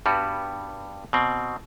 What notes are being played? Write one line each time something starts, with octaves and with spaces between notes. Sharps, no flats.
G2 G3 B3 F#4
B2 C4